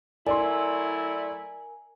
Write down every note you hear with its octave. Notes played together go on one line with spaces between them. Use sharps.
F#3 A3 E4 A#4 D5 G#5 C6